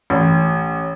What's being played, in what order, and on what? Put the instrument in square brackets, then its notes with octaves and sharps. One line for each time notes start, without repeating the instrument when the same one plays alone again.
[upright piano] A1